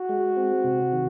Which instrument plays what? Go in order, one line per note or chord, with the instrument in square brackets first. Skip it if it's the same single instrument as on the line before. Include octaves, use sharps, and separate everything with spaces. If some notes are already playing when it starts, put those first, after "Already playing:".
Already playing: [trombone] F#4
[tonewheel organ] G#3
C4
C3
D#3